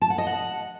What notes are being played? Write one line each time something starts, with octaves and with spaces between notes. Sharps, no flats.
A5
F#5
D#5
F#5